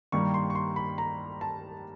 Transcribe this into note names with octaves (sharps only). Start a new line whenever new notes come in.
G2 D#3 G3 A#3 C#6
C6
C#6
C6
B5
A#5
A5